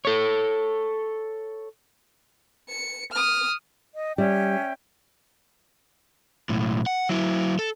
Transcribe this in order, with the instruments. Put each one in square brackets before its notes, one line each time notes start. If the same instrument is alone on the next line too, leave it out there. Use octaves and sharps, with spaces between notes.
[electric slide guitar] A4 C#5
[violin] C#7
D#6 F6
[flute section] D#5
[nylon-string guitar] G3 [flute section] C#4 E5 G5
[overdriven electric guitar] B1 A2
F#5
F#3 E4
A4